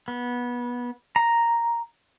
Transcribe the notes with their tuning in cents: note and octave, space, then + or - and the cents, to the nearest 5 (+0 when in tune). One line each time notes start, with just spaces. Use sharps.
B3 -20
A#5 +0